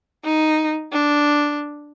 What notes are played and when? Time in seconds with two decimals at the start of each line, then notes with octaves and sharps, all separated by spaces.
0.24 D#4
0.92 D4